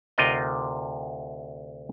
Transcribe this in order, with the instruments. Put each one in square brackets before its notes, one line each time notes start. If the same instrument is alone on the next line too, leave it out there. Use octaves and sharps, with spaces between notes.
[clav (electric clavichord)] D2 C3 D#4 F4 A#4 D#5